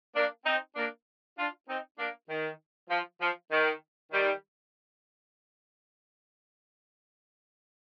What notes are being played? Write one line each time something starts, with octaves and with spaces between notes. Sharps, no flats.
A#3 D4
C4 D#4
A#3 D4
D4 F4
C4 D#4
A#3 D4
D#3
F3
F3
D#3
D#3 G3